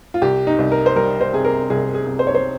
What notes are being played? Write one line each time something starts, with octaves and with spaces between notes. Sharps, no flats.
F4
C2 G4
D#4
C2
A#4
C5
G3 A#4
C5
C3 G#4
A#4
C2 G#4
G#4
C2
C5
C#5
C5